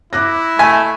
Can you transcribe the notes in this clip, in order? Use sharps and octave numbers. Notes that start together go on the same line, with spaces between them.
E4 D6 F#6 A#6
A3 G#5 B6